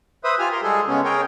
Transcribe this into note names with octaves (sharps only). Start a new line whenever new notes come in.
B4 C5 E5 D#6
F4 G4 G#5 F6
A#4 C6
G3 G#3 G#4 A4
C#3 G#3 B3 C#4
G#4 A#4 C#5 G5